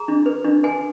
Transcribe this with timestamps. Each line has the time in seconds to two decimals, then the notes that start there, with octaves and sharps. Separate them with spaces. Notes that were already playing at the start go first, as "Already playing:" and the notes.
Already playing: G#4 A#5
0.08 D4
0.26 B4
0.44 D4
0.63 B4 G#5